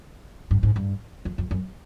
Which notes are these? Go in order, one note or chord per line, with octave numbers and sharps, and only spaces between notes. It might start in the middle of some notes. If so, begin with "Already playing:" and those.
G2
G#2
G2
F2
F2
F#2